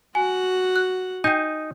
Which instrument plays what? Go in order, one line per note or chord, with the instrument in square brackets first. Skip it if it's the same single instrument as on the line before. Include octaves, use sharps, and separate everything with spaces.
[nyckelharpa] F#4 F#5 [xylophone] G#5
[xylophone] F#6
[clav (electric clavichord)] D#4 G#5 [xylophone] G5 G6